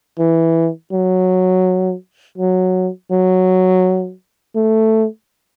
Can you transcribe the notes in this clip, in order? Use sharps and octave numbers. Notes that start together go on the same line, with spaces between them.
E3
F#3
F#3
F#3
A3